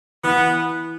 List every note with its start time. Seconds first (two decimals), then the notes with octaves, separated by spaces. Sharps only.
0.23 E3 B3